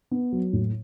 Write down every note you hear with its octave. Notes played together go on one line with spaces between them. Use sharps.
B3
F#3
A2